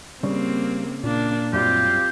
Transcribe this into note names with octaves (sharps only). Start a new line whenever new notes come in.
C#3 G3 A#3 C4
A#2 A#3 D4
F#2 G3 C4 F4 G4